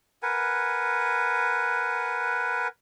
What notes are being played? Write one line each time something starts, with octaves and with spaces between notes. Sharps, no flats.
A#4 B4 F#5 G#5